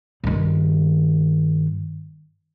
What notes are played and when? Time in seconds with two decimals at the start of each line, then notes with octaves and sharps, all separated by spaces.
0.24 G2 D#3